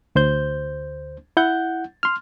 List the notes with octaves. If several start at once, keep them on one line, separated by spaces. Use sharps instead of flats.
D2 C5 G6
E4 F#5 G6
C6 F6